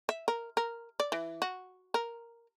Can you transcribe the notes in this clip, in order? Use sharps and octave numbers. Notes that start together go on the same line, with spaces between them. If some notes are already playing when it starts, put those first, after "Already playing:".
E5
A#4
A#4
D5
E3
F#4
A#4